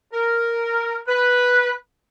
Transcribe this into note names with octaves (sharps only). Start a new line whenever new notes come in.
A#4
B4